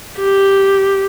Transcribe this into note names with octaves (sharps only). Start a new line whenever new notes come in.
G4